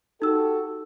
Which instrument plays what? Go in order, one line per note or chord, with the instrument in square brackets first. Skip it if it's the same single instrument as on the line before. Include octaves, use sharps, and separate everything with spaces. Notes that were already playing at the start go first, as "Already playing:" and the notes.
[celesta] D#4 E6 [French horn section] F#4 G4 A4